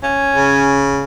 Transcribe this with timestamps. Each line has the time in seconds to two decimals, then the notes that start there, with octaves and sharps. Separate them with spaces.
0.03 C#4
0.33 C#3